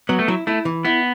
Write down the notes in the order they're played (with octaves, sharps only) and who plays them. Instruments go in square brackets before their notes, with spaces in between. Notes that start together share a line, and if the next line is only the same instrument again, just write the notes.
[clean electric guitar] F#3 [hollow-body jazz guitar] B3
[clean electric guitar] A3
[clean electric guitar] F#3 [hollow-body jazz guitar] E4
[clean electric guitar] A3 [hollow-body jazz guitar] E4
[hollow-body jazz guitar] E3
[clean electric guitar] B3 [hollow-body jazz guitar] E4